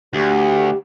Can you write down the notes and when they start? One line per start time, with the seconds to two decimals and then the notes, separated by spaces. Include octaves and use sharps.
0.14 D2 G4